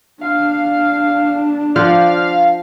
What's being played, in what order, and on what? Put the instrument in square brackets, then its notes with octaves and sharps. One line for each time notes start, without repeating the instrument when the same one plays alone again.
[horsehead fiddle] D4 [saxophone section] F5
[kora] F3 C5 F#5 [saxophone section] D5 [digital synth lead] F5